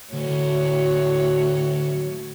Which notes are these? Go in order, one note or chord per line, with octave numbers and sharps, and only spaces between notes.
D2 A2 F#4 C#5